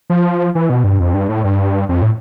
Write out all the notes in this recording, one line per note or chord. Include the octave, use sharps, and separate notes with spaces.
F3
E3
B2
G2
F2
G2
A2
G2
F2
A2